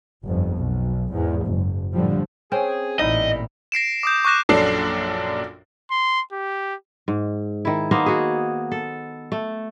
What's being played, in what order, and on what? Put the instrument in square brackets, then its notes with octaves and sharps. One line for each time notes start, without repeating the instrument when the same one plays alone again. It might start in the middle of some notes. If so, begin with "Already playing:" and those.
[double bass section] G1 F2
B1
E2 G#2
F#1
A2 D3 F3 G3
[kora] C4 C#4 G5 [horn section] G#4
[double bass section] A1 A#2 [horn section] G3 E4 [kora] D#4 [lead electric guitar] D#5
[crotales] A#6 C7 D7 E7
D6 D#6 G6
C#6 D6 F#6 A#6 E7
[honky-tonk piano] A#1 F#2 D4 A4 C7
[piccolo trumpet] C6
G4
[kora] G#2
D#3 E4
A#3 B3 D#4 C5
F#4 G#4
A4
A3